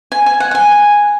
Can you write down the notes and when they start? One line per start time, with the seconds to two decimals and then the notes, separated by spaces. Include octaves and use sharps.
0.12 G#5
0.26 G#5
0.40 F#5
0.51 F#5
0.55 G#5